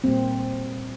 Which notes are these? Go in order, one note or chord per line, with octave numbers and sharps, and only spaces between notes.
A#2 G3 A#3 C4